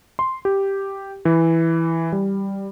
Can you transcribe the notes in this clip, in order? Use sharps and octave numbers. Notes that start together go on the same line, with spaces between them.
C6
G4
E3
G3